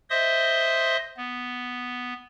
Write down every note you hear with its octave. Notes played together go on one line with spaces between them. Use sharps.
C5 D#5 E5 C6 D#6
B3